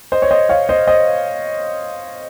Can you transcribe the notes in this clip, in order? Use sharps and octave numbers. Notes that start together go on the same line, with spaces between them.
C5 D#5
C#5
C5 D#5
C#5 F5
C5 D#5
C5 D#5